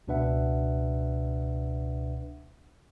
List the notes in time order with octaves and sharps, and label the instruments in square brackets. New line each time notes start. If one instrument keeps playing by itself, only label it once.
[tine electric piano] C#2 B2 D4 B4 E5 F#5